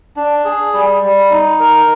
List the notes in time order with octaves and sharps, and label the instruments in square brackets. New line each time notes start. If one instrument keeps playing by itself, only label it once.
[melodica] D4
G#4
G3
G3
D#4
A#4